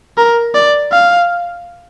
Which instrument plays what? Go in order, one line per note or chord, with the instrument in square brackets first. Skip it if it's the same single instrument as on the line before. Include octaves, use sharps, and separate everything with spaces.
[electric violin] A#4
D5
F5